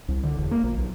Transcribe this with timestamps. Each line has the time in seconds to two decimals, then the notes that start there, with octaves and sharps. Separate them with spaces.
0.08 C2
0.23 D3
0.37 E1
0.51 A#3
0.64 A#1
0.78 B1